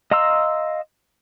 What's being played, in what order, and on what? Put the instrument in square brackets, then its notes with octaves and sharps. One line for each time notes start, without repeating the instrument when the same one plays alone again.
[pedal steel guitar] D#5 F5 A#5 C6 E6